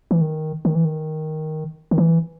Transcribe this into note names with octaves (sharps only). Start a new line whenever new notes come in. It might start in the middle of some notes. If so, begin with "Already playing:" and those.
E3
D#3
D#3
E3
D#3
D#3
E3